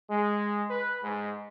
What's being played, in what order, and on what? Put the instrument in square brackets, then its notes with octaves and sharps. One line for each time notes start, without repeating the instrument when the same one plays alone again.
[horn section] G#3
B4
G#2